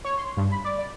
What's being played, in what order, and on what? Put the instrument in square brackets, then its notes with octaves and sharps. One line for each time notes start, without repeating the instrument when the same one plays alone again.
[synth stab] C#5
C6
G2
B5
D5
D5